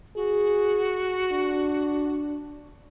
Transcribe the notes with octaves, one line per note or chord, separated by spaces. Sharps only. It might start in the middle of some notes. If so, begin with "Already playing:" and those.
F#4 G#4
D4